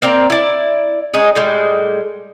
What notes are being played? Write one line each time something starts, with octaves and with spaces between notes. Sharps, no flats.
A#3 C4 D5 A#5
E4 D5
G#3 C#4 D#4 G#4
A2 G3 G#3